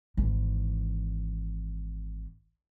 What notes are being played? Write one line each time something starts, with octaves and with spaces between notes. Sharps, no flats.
G#1 E3